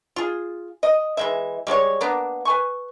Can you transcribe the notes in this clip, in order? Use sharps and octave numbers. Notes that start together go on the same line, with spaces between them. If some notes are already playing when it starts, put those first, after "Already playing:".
F4 G#4
D#5
E3 G#3 E5
G3 G#3 F4 C#5
A#3 B3 D4
B4 G#5 C#6